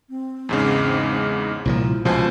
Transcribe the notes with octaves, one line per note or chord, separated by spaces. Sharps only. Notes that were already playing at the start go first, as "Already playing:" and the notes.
C4
E2 G#2 C#3
C2 A#2 F3 E4
C#2 B2 F3 C5 G#5 A5